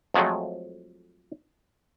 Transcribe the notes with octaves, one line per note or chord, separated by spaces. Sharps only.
F2 F3 F#3 G#3 A3